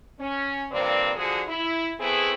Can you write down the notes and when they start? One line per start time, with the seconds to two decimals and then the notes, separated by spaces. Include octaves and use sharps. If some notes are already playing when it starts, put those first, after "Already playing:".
0.20 C#4
0.72 G2 C3 F3 A#3 C4 D5
1.16 D3 F3 F#4 G#4
1.48 E4
2.00 A3 B3 C4 E4 G#4